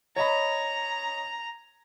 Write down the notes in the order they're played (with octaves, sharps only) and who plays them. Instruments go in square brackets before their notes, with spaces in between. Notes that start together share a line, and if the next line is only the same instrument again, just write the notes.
[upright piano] C#5 D#5 B5 [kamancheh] A#5